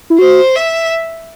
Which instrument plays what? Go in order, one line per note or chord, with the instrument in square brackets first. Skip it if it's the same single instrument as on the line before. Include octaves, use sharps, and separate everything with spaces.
[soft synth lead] E4
[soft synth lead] F#4 [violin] C5
[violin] E5